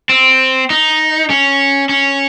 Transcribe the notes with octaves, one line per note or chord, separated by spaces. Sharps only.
C4
D#4
C#4
C#4